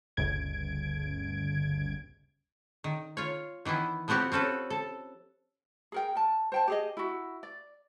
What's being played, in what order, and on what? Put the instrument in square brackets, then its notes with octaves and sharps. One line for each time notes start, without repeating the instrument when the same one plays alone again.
[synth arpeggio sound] G1 D2 C#3 G#6 D7
[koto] D#3
F4 C#5
D#3 E3 B3 E4
F3 B3 C4 F#4 G4
C4 C#4 A4 B4
A4
[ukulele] G#4 A#4 G5
A#4 A5
C5 G5 A5
G4 G#4 D#5
E4 F#4
D5